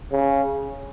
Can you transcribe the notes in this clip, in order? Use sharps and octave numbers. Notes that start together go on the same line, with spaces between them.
C#3